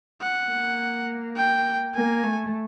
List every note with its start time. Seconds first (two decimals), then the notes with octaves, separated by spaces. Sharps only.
0.22 F#5
0.50 A#3
1.36 G5
1.95 A#3 G#5
2.23 A3